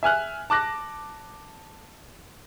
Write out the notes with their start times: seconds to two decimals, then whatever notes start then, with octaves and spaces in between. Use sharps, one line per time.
0.03 E5 G#5 F6 F#6
0.50 A5 D6 F#6 A#6